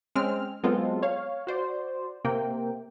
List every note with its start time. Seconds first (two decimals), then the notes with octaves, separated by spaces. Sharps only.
0.15 G#3 C4 C#4 F6
0.63 F#3 G#3 B3 C4 F4 A4
1.03 C#5 F5
1.47 F#4 C5 D5
2.25 C3 A#3 G5